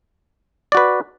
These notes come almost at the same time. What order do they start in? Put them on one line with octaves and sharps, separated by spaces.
D5 F#4 B4